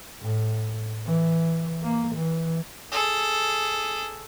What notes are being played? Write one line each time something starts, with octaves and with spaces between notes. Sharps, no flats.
A2
E3
A#3
E3
G#4 A4